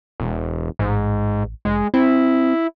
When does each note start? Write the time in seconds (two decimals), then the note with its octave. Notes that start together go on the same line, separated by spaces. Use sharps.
0.20 E1
0.79 A1 G#2
1.65 F1 G#3
1.94 C4 E4